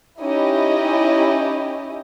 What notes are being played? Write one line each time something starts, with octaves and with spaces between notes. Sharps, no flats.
C#4 D#4 E4 G4 D#5